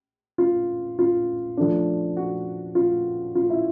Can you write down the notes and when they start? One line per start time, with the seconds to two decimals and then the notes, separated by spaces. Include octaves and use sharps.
0.38 F4
0.99 F4
1.57 F3 A3 D4
2.17 F#4
2.75 F4
3.35 F4
3.50 E4